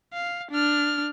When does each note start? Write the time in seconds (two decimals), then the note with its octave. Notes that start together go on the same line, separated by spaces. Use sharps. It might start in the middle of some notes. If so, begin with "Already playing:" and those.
0.13 F5
0.51 D4 F6